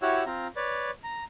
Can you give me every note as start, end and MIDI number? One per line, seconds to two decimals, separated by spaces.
0.02 0.24 64
0.02 0.24 66
0.02 0.24 67
0.02 0.24 73
0.02 0.24 78
0.02 0.24 88
0.26 0.47 60
0.26 0.47 65
0.26 0.47 82
0.56 0.91 71
0.56 0.91 73
0.56 0.91 74
1.04 1.24 82